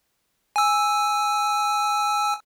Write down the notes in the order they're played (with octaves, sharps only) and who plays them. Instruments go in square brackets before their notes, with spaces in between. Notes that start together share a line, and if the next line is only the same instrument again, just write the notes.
[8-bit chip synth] G#5 E6